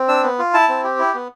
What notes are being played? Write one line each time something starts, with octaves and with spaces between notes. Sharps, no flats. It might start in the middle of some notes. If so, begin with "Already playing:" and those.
Already playing: C4
D4 E6
B3
F4
E4 A5
C4
G4
E4
B3